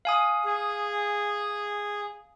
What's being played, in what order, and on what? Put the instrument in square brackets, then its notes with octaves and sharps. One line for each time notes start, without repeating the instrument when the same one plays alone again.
[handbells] F5 G#5 D#6
[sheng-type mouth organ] G#4